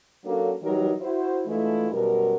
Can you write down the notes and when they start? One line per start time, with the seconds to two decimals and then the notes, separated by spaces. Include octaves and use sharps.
0.24 F#3 A#3 C#4 D4 F#4 A4
0.61 E3 F#3 G3 D#4 A#4
1.00 E4 F#4 C5
1.46 E3 G#3 A3 D4 E4 F4
1.91 F#2 B2 G3 F#4 A#4